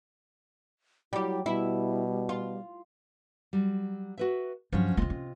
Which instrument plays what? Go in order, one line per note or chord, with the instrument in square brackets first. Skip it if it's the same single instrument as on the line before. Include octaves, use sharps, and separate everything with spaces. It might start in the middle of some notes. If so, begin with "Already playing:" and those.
[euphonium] F#3 [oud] G3 G4 [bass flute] E4
[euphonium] B2 [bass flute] G3 [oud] E4
[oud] F4
[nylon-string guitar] F#3 G3
F#4 B4 E5
[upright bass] G2 [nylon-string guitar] F3 F#3 C#4
[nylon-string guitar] C3 F4 D#5 [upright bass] A#3 C4
[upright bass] C#4